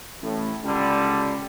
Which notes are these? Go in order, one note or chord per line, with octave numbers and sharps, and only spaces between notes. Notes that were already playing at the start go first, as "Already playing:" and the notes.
A1 A2
C#2 D3 G3